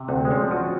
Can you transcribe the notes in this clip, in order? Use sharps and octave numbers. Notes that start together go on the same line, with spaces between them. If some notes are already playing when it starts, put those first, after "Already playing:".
Already playing: C3
D2 C4
G#3
C#4
F3
F#4